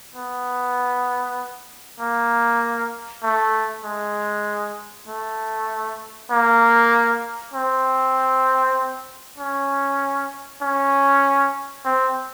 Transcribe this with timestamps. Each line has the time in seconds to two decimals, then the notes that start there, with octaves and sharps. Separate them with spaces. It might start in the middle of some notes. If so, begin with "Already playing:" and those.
0.16 B3
2.00 A#3
3.23 A3
3.84 G#3
5.08 A3
6.31 A#3
7.54 C4
9.39 C#4
10.62 C#4
11.85 C4